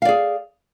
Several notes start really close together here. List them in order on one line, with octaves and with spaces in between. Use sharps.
F5 D5 G#4